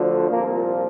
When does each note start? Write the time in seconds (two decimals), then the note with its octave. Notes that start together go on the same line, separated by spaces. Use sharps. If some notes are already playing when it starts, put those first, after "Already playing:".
Already playing: D2 D3 F3
0.30 C2 A#2 F3 A#3